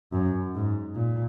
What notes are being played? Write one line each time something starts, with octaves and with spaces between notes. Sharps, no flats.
F#2
G#2
A#2